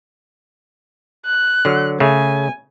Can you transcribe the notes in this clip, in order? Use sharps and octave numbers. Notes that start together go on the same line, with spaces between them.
F#6
D3 F#3
C#3 A3 G#5